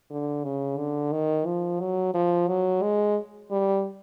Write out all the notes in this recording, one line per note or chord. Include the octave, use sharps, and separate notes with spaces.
D3
C#3
D3
D#3
F3
F#3
F3
F#3
G#3
G3